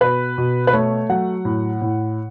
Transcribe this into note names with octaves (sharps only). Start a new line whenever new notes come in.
B2 B4
B2
B4
A3 C#5
F#3 F#5
A2
A2